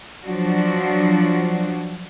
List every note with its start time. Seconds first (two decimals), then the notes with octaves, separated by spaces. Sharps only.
0.24 F3 F#3 D4 F#4